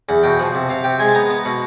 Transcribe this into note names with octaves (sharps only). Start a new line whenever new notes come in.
E2 F#5
B2 G5
F3 F#5
C3
C3 F5
C3 G5
G#3 G#5
A5
B3 A#5
B3
B2 F#5